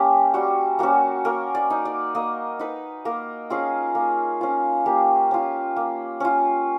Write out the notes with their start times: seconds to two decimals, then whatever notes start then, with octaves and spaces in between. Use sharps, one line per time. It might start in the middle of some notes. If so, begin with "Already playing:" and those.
Already playing: A#3 C#4 G4
0.34 G3 F#4
0.79 A#3 C#4 F#4
1.25 A#3 A#4
1.55 D5
1.70 D#4
1.85 D5
2.15 A#3 D#5
2.59 D#4 B4
3.05 A#3 A#4
3.50 C#4 F4 G#4
3.95 A#3
4.41 C#4 F4
4.86 A#3 G4
5.31 C#4 F4
5.76 A#3
6.20 C#4 F4